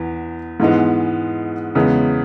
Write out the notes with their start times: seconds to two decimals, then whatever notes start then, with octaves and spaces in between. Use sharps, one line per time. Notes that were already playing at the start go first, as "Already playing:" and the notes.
Already playing: E2 B3
0.60 G#2 E3 G#3 B3
1.75 E2 C#3 G#3 B3